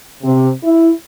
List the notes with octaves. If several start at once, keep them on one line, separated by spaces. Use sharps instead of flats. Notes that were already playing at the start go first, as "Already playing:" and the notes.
C3
E4